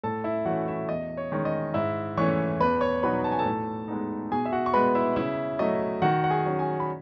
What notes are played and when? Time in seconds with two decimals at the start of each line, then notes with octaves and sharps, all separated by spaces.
0.03 A2 A4 A5
0.24 E4 E5
0.45 E3 A3 C#4 F#4 F#5
0.68 E4 E5
0.89 E2 D#5
1.17 C#5
1.32 D#3 G#3 C#4
1.45 D#5
1.74 G#2 E4 E5
2.17 E3 A3 C#4 C#5 C#6
2.60 E2 B4 B5
2.81 C#5 C#6
3.03 B2 F#3 B3 D#4 B4 B5
3.24 A5
3.32 G#5
3.39 A4 A5
3.46 A2
3.88 G#3 B3 D#4
4.31 B2 G#4 G#5
4.45 E5
4.52 F#4 F#5
4.66 C#6
4.73 G#3 B3 B4 B5
4.95 E4 E5
5.16 C#3 E4 E5
5.59 F#3 A3 D#5
6.02 D#3 F#4 F#5
6.24 F#5
6.30 G#4 G#5
6.45 F#3 C#4
6.59 G#4 G#5
6.80 B5